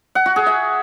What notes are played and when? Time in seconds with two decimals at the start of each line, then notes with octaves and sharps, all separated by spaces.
0.15 F#5
0.26 F#4
0.36 G#4
0.46 E5